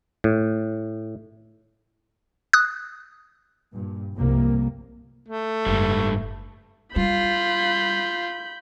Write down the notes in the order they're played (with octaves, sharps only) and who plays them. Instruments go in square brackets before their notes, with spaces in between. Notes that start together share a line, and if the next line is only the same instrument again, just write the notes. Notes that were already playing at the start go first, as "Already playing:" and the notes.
[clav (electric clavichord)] A2
[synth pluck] D#6 F#6
[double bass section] G2 A#2
F1 C2 C3 A#3
[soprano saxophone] A3
[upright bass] F#1 [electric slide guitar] G#2 G3
[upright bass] G3 [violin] F4 [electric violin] B5 G6